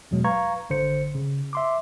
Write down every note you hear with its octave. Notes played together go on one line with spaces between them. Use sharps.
E2 B2 F#3 G#3
B4 F5 A#5 C#6 G#6
G#1 D3 C5 C#7
C#3
E5 C6 D6